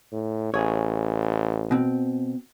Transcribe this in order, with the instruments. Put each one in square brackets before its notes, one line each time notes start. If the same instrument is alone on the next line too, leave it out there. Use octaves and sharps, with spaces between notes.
[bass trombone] A2
[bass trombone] A1 [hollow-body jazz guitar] G#4 C#5
[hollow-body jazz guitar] B2 C4